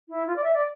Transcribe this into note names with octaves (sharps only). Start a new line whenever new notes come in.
E4
F4
D5
E5
D5